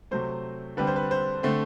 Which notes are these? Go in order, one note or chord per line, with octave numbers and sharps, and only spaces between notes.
C3 F#3 A3 C5
D3 G3 C4 B4
C5
B4
C5
D3 A3 C4